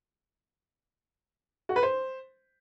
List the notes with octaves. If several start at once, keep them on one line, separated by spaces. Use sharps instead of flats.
F#4
B4
C5